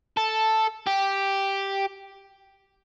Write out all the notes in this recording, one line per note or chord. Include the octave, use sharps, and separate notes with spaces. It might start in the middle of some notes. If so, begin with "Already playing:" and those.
A4
G4